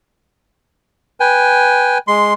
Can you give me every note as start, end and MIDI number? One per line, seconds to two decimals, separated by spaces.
1.20 1.98 71
1.20 1.98 79
1.20 1.98 80
2.08 2.34 56
2.08 2.34 84